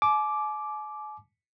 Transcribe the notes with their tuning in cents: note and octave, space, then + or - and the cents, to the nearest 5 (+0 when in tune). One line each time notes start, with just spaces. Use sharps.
G#5 +45 D6 +0